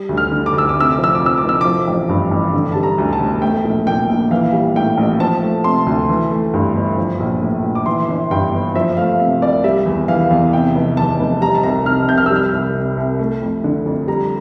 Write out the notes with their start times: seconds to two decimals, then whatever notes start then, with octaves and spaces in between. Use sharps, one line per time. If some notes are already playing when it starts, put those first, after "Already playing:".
Already playing: G3
0.09 D2
0.17 F6
0.32 D3
0.46 D6
0.53 D2
0.58 E6
0.69 D6
0.76 C3 E6
0.92 D6
0.99 F3
1.04 E6
1.15 F2 D6
1.26 E6
1.38 D6
1.43 F1
1.49 E6
1.61 F3 D6
1.88 A1
2.09 G2
2.31 A1
2.53 D3
2.72 G3 A5
2.83 A#5
2.98 D2
3.13 A5
3.20 E1
3.42 A3 G5
3.65 A#1
3.87 A#2 G5
4.09 A#1
4.31 E3 F5
4.53 G3
4.76 A2 G5
4.97 A1
5.20 F3 A5
5.43 A3
5.64 C3 C6
5.86 D2
6.09 E3
6.31 A3
6.53 G2
6.75 G1
6.97 F3
7.20 A#1
7.42 A2
7.64 A#1
7.75 D6
7.86 E3 C6
8.09 G1
8.31 G2 G5
8.53 G1
8.75 F3 E5
8.97 A3 F5
9.20 C3 E5
9.41 C2 D5
9.64 G3 E5
9.86 E2
10.08 E3 F5
10.31 E2
10.53 C3 G5
10.75 F1
10.97 E2 A5
11.19 F1
11.41 G3 A#5
11.55 A5
11.63 C2 A#5
11.85 C3 F6
12.08 C2 G6
12.18 F6
12.26 G3 E6
12.36 F6
12.53 C2
12.74 C3
12.97 C2
13.19 A3
13.42 F2
13.64 D3
13.86 F2
14.07 G3 A#5